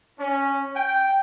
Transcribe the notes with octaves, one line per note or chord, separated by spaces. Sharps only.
C#4
G5